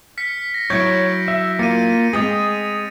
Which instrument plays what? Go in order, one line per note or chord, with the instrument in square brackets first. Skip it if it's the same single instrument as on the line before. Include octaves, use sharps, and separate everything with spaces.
[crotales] F6 B6 C#7
A#6
[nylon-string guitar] F#3 E4 [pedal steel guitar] C#5 [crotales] G6 D7
[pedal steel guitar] E5
[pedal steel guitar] A#3 F4 [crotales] C#7 D#7
[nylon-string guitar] G#3 C4 [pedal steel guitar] G#4 D#6 [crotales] A6 F7